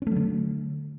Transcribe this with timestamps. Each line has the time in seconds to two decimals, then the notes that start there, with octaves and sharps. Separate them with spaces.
0.02 C#4
0.07 A3
0.11 F#3
0.16 D3